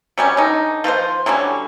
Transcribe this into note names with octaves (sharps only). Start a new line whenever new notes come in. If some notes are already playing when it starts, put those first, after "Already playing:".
F#3 G3 C#4
D3 D#4
F3 F4 B4 C5
D3 F#3 G3 C#4